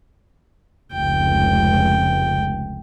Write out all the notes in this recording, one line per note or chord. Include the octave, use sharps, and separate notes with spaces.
F1 C#2 G5